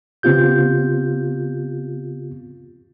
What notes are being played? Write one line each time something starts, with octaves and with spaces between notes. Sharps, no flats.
C#3 B3 C4 F4 G4 G6